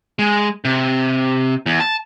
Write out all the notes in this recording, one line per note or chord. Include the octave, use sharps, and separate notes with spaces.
G#3
C3
E2
A5